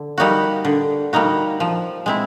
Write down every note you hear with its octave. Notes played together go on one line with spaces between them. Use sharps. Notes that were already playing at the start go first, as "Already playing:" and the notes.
Already playing: D3
G3 A#3 D#4 F#4
D3
G3 A#3 D#4 F#4
F3
G#3 C4 E4